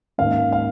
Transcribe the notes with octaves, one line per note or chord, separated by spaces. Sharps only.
G#2 D#3 A#3 C#4 F5
F5